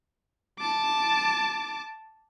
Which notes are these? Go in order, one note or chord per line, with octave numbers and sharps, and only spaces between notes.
A5 D6